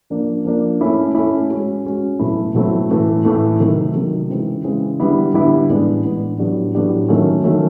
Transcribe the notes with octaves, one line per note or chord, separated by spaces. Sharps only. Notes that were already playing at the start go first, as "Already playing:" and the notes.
F3 A#3 D4
F3 A#3 D4
A3 C#4 E4
A3 C#4 E4
G#3 C#4 F#4
G#3 C#4 F#4
B2 F#3 A3 C4 E4
B2 F#3 A3 C4 E4
A2 E3 A3
A2 E3 A3
C3 D#3 F#3 A3
C3 D#3 F#3 A3
C#3 E3 G#3 C4
C#3 E3 G#3 C4
D3 G3 B3 E4
D3 G3 B3 E4
A2 E3 G#3 B3 D4
A2 E3 G#3 B3 D4
A2 F#3 B3 D4 G4
A2 F#3 B3 D4 G4
D#3 F#3 A3 C#4
D#3 F#3 A3 C#4